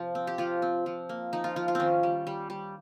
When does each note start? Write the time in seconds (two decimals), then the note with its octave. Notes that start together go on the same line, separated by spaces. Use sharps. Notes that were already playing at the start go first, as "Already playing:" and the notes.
Already playing: C3 F3 F4
0.15 C4
0.27 G4
0.38 F3 F4
0.62 C4
0.86 F3
1.09 A#3
1.33 F3 D#4
1.44 F4
1.56 F3 F4
1.68 F4
1.75 D#3 C4 C#4
2.03 G3
2.27 G3
2.50 G3